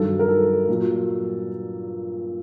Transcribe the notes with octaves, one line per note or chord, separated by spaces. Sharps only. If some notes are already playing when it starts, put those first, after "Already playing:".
Already playing: G2 D#3 F#3 A4
A#4
A4
A#2 F#3